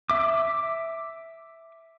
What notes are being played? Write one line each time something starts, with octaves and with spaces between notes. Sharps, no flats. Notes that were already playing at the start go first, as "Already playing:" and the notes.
E5 D6